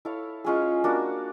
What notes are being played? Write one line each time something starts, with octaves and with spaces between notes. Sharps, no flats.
E4 A4 C#5 F5
G#3 C#4 F4 G#4
A#3 D4 F#4